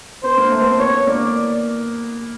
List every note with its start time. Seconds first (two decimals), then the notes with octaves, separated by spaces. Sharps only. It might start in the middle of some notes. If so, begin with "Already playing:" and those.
0.23 B3 C5
0.37 A#3
0.51 A3 C5
0.61 B3
0.70 C4
0.79 B3 C#5
1.07 A#3 D5